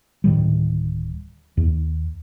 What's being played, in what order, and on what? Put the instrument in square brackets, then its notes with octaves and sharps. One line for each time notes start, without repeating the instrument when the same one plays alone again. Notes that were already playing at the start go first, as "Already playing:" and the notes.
[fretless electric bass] D1 A2 D#3 G3
D#2